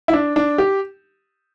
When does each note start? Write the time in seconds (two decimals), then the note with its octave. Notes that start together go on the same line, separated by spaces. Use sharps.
0.08 E4
0.13 D4
0.36 D4
0.58 G4